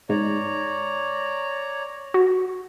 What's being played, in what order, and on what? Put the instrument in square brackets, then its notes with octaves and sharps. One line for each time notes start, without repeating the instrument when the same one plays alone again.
[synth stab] G#2 [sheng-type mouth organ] C#5 D5 A#5
[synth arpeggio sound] F#4